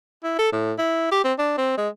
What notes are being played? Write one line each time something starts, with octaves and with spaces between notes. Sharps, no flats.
E4
A4
A2
E4
G4
C4
D4
C4
G#3